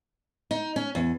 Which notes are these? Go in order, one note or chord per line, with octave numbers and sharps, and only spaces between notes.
D#4
C#4
E2